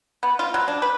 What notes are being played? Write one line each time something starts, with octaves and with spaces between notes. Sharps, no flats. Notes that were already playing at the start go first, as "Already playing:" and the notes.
B3
F4
F#3
D4
B4